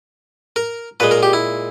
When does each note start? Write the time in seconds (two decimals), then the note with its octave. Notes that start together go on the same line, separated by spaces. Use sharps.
0.56 A#4
1.00 A#2 G#3 B4
1.11 A#4
1.23 G4
1.33 E4